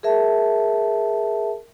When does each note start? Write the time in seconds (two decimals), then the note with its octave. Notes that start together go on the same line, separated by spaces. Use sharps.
0.03 G#4 A#4 E5 A5